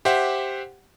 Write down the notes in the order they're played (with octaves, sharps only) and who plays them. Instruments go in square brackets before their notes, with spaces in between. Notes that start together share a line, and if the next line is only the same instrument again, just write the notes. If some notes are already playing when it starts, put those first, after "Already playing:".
[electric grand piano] G4 C5 E5 F#5